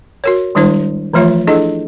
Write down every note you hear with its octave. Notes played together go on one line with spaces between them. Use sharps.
F#4 A#4 C#5
D#3 G3 G#3 D4 E4 C5
E3 F3 A3 F4 C#5 E5
D4 E4 G#4 A4 D#5